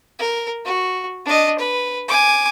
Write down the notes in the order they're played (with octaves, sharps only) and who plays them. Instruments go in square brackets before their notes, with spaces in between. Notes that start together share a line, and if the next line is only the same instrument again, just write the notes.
[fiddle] A#4
F#4
D4 D#5
B4
G#5 D6